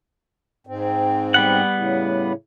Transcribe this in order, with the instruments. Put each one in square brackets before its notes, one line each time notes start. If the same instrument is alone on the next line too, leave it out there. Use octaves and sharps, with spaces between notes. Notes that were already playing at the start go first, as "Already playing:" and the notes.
[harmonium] G#2 C4
[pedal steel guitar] G3 B3 F#5
[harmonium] A2 C#3